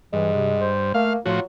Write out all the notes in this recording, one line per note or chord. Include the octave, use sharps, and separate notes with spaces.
G2 E3 G#3
C3
C5
A3 A#3 F5
A2 F3 F#3 F4 F#4